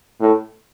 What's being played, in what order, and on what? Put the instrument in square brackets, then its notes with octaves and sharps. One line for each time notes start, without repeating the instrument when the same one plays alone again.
[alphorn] A2